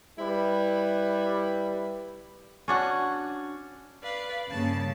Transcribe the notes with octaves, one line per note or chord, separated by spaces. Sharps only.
G3 E4 B4
C#4 D4 F#4
B4 D5 F5
G2 C#3 G3 A#3 A5